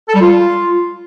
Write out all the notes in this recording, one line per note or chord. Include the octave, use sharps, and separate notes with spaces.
A4
G3
F4